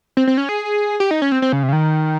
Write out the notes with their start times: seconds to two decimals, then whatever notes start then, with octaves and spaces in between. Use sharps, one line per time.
0.17 C4
0.27 C4
0.37 C#4
0.49 G#4
1.00 G4
1.11 D#4
1.22 C#4
1.32 C4
1.42 C4
1.53 C#3
1.63 C3
1.69 C#3
1.73 D#3